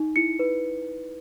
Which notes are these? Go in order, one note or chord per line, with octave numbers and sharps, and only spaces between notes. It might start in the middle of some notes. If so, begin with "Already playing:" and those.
Already playing: D#4
E4 C#7
B4